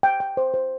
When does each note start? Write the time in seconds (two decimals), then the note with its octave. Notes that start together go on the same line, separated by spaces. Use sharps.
0.03 G5
0.20 G5
0.37 C5
0.54 C5